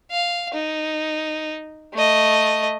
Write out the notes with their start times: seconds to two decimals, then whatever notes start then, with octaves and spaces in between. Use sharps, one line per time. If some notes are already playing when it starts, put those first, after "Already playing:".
0.11 F5
0.54 D#4
1.94 A3 D#5